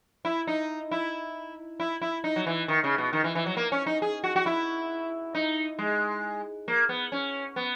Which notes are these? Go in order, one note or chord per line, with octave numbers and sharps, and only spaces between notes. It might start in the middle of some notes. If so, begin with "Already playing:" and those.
E4
D#4
E4
E4
E4
D#4
F#3
E3
D#3
C#3
B2
D#3
E3
E3
F#3
A#3
C#4
D#4
G#4
F#4
F#4
E4
D#4
G#3
A#3
B3
C#4
B3